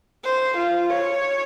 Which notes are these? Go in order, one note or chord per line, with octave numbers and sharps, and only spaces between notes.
C5
F4
C#5